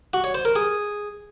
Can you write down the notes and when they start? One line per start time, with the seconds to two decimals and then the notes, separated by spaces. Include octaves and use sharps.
0.13 F#4
0.24 C#5
0.35 C5
0.45 A#4
0.56 G#4